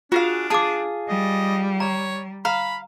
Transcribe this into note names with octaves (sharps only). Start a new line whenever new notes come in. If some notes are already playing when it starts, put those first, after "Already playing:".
D4 F4 F#4 G#4 F5
F4 G#4 A5 D6
G3 D#5
C#5 A#5
F5 A#5 B5